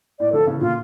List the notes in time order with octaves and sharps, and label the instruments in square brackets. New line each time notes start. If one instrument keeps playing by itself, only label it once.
[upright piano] A2 [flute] D5
[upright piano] D3 F3 [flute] A4
[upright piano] C#3 E3
[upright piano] A#2 D3 [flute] F4